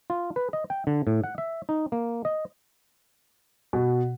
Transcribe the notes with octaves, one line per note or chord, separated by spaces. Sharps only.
F4
B4
D#5
G5
D3
A2
F#5
E5
D#4
A#3
D#5
B2